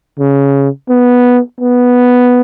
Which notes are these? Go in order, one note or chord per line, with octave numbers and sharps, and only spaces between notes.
C#3
B3
B3